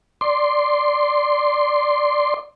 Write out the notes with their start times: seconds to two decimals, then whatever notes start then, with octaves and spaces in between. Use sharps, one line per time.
0.21 D5 C6